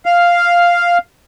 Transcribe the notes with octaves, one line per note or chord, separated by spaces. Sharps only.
F5